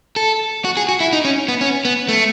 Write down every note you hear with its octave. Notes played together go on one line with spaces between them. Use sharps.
A4
F#4
G#4
F#4
E4
D#4
C#4
B3
C#4
B3
A3